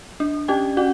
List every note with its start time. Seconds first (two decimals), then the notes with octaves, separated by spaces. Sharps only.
0.20 D4
0.48 C#4 G4 G5
0.77 C#4 F#4 F#5